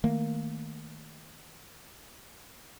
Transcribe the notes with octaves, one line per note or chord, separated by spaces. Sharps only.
D#3 A3 A#3